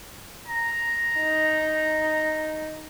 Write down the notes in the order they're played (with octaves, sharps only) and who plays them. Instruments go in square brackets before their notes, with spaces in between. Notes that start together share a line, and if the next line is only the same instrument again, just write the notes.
[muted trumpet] A#5
[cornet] D#4